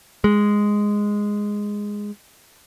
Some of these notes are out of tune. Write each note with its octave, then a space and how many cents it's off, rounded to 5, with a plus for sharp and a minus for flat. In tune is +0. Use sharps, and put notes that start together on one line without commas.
G#3 -5